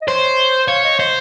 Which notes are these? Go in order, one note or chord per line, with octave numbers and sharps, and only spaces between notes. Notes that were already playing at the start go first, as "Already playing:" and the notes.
D#5
C5 C#5
C#5 F5
D#5
C5 D#5